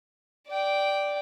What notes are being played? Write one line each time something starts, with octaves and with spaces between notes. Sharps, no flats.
D5 G5